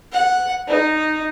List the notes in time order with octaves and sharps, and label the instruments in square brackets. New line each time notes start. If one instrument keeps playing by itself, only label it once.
[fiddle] F#5
D#4